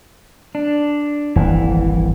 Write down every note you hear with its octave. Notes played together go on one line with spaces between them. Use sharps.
D4
D#1 G#1 F2 E3